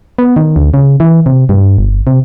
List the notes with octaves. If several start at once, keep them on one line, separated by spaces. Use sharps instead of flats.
B3
D#3
D2
C#3
E3
C3
G2
G1
C3